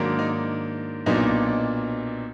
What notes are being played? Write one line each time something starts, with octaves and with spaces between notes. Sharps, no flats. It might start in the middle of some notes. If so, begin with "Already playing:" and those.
Already playing: G#2 D#3 F#3 A#3 D4
D#4
B1 A#2 F#3 B3 D4 D#4